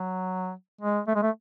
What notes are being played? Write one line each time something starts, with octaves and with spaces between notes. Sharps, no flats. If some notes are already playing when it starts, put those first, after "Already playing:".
Already playing: F#3
G#3
A3
G#3
A3